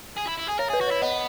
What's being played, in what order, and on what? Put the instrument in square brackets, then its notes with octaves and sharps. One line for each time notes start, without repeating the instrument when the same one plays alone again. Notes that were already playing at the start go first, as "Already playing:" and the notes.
[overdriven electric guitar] G#4
E4
E4
G#4
[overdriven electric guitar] A#4 [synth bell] C#5
[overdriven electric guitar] G#4 [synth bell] B4
[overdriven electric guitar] F#4
[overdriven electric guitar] E4 [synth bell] C#5
[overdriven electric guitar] B3 [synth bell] D#5